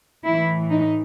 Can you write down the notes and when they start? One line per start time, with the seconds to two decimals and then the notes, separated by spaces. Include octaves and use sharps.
0.25 A2 E3 E4
0.70 D#4